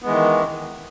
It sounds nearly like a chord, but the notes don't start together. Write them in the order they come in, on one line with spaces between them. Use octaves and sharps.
B3 G#3 E3 D#3